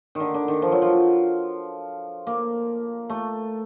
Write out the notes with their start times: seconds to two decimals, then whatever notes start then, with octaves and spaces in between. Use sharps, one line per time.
0.15 D#3
0.20 D3
0.34 D3
0.48 D#3
0.62 F3
0.72 F#3
0.82 F3
2.27 A#3
3.09 A3